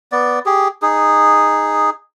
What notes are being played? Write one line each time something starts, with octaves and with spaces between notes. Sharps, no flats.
B3 D5
G4 G#4
D#4 G#4